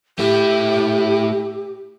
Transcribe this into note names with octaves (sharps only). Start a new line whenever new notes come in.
A3 E4 G4